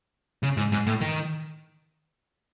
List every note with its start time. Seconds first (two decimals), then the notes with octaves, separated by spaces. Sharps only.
0.43 C#3
0.57 G#2
0.72 G#2
0.87 A2
1.01 D#3